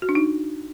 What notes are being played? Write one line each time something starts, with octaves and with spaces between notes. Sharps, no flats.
F#4
D4
D#4